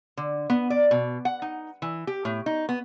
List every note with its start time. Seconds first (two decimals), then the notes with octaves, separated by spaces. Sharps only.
0.17 D3
0.50 B3
0.70 D5
0.91 B2
1.25 F#5
1.42 D#4
1.82 E3
2.07 G4
2.25 A2
2.46 D#4
2.69 B3